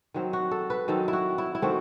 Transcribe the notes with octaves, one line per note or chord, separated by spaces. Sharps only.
D#3 F#3 C4
F#4
A4
B4
D#3 F#3 C4 A4
E4
F#4
E4
E4
D#3 A3 C4 F#4